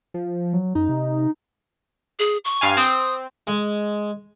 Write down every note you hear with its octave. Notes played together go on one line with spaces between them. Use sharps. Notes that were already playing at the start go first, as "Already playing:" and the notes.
F3
F#3
F#2 D#4
C3
G#4
C#6
G2 F5 G#5
C4 D#6
G#3